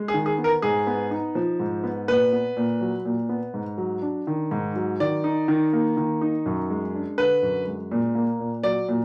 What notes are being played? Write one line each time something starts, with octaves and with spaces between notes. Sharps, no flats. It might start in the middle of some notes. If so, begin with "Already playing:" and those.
Already playing: G#3
G#4
D#3
G#4
B3
A#4
G#2 G#4
B3
D#4
F3
G#2
B3
A#2 B4
B3
A#2
F#3
A#2
B3
G#2
F#3
D4
D#3
G#2
F#3
D#3 D5
D#4
D#3
A#3
D#3
D#4
F#2
G#3
D4
D3 B4
F#2
G#3
A#2
A#3
A#2
F#3 D5
A#2